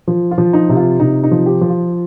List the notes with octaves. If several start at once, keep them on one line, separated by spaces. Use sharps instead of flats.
F3
F4
F3
D#4
C3
F4
C3 D#4
D#4
F3
G4
F3
F4